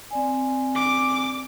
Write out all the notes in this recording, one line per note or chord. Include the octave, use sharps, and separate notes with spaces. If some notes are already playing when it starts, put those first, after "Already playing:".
C4 D5 G#5
D6